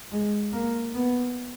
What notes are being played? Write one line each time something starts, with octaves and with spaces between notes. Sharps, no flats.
G#3
A#3
B3